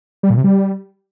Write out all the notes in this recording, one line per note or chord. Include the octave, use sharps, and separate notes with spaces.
G3
A#2
C3
G3